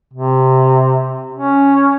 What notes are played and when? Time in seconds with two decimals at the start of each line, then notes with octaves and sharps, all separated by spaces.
0.13 C3
1.34 C#4